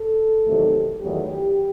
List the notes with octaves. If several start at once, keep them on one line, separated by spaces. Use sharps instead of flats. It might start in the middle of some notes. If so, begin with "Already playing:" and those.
Already playing: A4
E2 C3 D#3 F#3 A3
E2 D#3 F#3 A3 G4